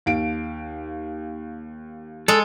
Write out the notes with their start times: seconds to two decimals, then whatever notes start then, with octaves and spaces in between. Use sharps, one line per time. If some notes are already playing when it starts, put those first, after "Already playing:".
0.06 D#2 F5 D7
2.28 G#3 A4